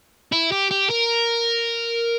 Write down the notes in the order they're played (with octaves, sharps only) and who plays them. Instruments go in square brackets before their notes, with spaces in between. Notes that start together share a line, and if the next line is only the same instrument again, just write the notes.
[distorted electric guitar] E4
G4
G4
A#4